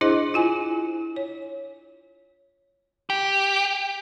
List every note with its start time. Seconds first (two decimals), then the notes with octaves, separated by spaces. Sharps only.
0.01 D4 E4 G#4 C5 D#5
0.34 E4 F4 G#5
1.16 C#5
3.10 G4